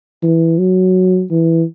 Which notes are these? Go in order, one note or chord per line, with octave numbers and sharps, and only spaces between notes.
E3
F#3
E3